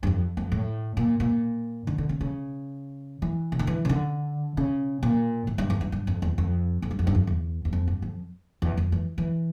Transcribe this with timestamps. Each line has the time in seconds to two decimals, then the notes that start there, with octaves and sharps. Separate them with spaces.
0.03 G2
0.07 F2
0.37 F2
0.52 A2
0.97 A#2
1.20 A#2
1.87 D3
1.98 D3
2.09 C#3
2.21 C#3
3.22 E3
3.52 C#3
3.59 D3
3.67 E3
3.85 C#3
3.89 D3
4.57 C#3
5.03 A#2
5.47 A2
5.58 G2
5.70 E2
5.81 G2
5.92 G2
6.07 F2
6.22 E2
6.38 F2
6.82 F2
6.91 G2
6.99 F2
7.07 G2
7.15 F2
7.27 E2
7.65 E2
7.73 F2
7.88 G2
8.02 F2
8.62 E2
8.77 F2
8.92 E3
9.18 E3